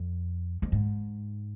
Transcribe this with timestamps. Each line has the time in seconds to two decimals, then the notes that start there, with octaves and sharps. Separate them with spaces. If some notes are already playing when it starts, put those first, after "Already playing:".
Already playing: F2
0.62 F2
0.72 G#2